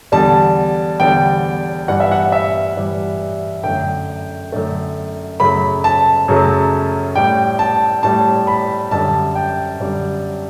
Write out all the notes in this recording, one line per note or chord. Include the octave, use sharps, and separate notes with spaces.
E2 D3 G3 A5
E2 D3 G3 G5
G2 E3 G3 F#5
E5
F#5
E5
G2 E3 G3
F#2 D3 A3 G5
F#2 D3 A3
F#2 C#3 F#3 A3 B5
A5
F#2 C#3 F#3 A3
A2 G3 G5
A5
A2 G3 A5
B5
F#2 D3 G3 A5
G5
F#2 D3 G3